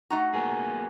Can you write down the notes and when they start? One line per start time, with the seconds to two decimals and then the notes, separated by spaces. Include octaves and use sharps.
0.10 A3 D#4 F#4 A#5
0.33 A#3 B3 G#4